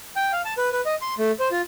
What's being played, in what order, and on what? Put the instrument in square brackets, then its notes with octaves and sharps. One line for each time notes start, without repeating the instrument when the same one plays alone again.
[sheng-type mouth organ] G5
F5
A5
B4
B4
D#5
C6
A3
C5
F4